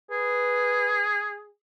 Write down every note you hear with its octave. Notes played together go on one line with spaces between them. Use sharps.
G#4 B4